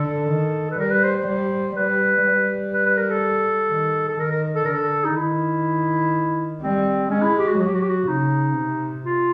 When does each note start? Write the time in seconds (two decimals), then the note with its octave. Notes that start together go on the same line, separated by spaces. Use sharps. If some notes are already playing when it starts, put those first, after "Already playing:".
Already playing: D3 A4
0.31 D#3
0.71 B4
0.79 G3 A#4
0.91 B4
1.04 C5
1.16 C5
1.27 G3
1.76 G3 B4
2.25 G3
2.73 B4
2.86 B4
2.97 A#4
3.10 A4
3.71 D#3
4.08 A4
4.19 D#3 A#4
4.31 A#4
4.56 A4
4.65 D3 A#4
4.73 A4
5.04 D#4
5.16 D#3 E4
6.62 G3 C4
7.11 G#3 C#4
7.22 E4
7.38 G4
7.47 F#4
7.59 F#3 F#4
7.66 G4
7.74 F#4
7.81 G4
7.89 F#4
8.08 C#3 D#4
8.56 C3
9.05 F4